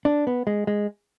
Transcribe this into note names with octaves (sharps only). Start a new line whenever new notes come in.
D4
B3
G#3
G#3